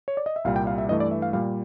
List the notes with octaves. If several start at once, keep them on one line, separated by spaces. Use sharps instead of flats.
C#5
D5
D#5
E5
C2 A#2 G3 F5
G5
F5
E5
G2 E3 A3 D#5
D5
E5
F5
A#2 G3 F5